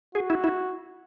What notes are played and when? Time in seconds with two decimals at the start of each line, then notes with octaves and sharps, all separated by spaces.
0.15 F#4 G#4
0.30 E4
0.44 E4